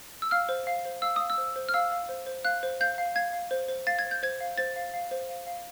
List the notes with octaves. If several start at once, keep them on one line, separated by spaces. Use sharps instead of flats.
E6
F5 F6
C5
F5
C5
F5 E6
F5 D#6
E6
C5
C5
F6
F5 E6
F5
C5
C5
F5 F#6
C5
F5 G6
F5
F5 G#6
F5
C5
C5
F5 A6
G#6
C5
G6
C5 G#6
F5
C5 A6
F5
F5
C5
F5
F5